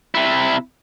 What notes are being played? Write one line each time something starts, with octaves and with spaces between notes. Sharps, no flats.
C3 E4